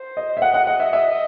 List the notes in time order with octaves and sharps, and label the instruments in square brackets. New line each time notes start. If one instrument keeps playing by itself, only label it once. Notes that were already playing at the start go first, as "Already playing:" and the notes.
Already playing: [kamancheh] C5
[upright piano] D#5
E5
[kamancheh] D#5 [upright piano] F#5
[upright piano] F#5
F#5
E5
E5